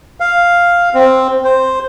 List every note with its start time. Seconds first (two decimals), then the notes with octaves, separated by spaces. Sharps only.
0.20 F5
0.94 C4
1.45 C5